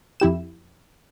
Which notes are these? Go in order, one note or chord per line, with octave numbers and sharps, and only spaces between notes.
F2 E4 G4 E7